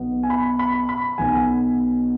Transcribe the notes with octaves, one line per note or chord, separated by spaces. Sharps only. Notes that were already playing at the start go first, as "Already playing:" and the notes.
Already playing: B1 B2 B3
G#5
B5
B5
B5
B1 B2 F#3 B3 G#5